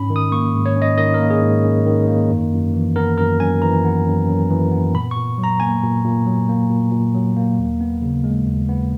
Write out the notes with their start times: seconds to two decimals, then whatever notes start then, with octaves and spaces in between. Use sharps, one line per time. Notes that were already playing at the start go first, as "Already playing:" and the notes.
Already playing: G#2 C#4 B5
0.10 D#3
0.16 D#6
0.32 A#3 C#6
0.54 G#2
0.66 C#5
0.76 C#4
0.82 D#5
0.97 D#3 D#5
1.14 A#4
1.20 A#3
1.30 G#4
1.42 G#2
1.63 C#4
1.86 D#3
2.08 A#3
2.30 F#2
2.52 F#2
2.74 E3
2.96 B3 A#4
3.18 F#2 A#4
3.40 F#2 G#5
3.62 E3 A#5
3.85 B3
4.06 F#2
4.28 F#2
4.50 E3
4.72 B3
4.94 A#2 B5
5.11 C#6
5.16 A#2
5.38 F#3
5.44 A#5
5.60 A#3 G#5
5.83 A#2
6.04 A#2
6.26 F#3
6.49 A#3
6.70 A#2
6.92 A#2
7.14 F#3
7.36 A#3
7.59 D#2
7.81 B3
8.02 C#3
8.24 G#3
8.46 D#2
8.69 B3